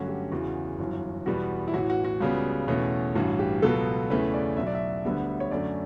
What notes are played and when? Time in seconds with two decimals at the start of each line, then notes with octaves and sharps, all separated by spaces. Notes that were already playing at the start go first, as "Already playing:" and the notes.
Already playing: G2 D3 F#3 A3 C#4 F#4
0.08 G4
0.32 E2 C#3 E3 F#4
0.79 G1 F#2 E3
1.26 E2 B2 G3 B3 F#4
1.68 E4
1.73 A1 A2 E3 F#4
1.90 F#4
2.05 F#4
2.20 C#2 C#3 G3 B3
2.67 E2 B2 A3 C#4
3.15 A1 G2 E3 F#4
3.39 G4
3.62 C#2 B2 F#3 B3 A4
4.10 E2 C#3 E3 A3 C#4 B4
4.34 D5
4.56 B1 B2 F#3 E5
4.67 D5
4.74 E5
5.05 D2 D3 G3 B3
5.40 C#5
5.51 F#2 D3 A3 C#4 D5